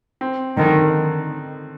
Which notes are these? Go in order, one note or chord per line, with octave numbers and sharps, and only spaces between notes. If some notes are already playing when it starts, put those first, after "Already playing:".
C4
D3 D#3